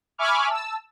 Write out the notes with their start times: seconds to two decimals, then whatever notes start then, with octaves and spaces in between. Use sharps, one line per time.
0.18 E5 G#5 B5 C#6 D6 F6
0.50 A5 E6